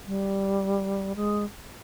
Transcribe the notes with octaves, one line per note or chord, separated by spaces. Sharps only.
G3
G#3